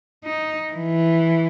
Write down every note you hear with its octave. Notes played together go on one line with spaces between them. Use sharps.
D#4
E3